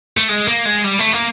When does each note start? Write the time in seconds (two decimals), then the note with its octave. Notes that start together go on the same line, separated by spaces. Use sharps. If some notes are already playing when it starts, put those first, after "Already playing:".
0.17 A3
0.29 G#3
0.48 A#3
0.66 G#3
0.84 G3
0.99 A3
1.12 A#3